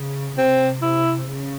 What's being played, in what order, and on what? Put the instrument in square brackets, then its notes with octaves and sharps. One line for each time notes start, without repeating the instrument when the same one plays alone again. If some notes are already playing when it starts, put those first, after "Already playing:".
Already playing: [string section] C#3
[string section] C3 [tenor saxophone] C4
[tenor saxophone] E4
[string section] C#3